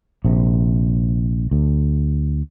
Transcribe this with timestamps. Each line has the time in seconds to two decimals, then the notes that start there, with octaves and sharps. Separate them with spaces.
0.25 A#1 C3
1.51 D2